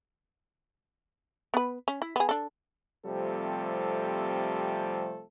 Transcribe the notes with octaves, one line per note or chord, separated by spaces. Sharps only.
B3 B4
C#4
E4
B3 G#4
D4 A4
C3 F3 G3 A3 C4 A4